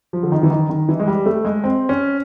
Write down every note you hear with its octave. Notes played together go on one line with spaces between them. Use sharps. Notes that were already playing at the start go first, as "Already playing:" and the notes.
F3
D3
D#3
E3
D#3
D#3
E3
G#3
G3
A3
G#3
C4
C#4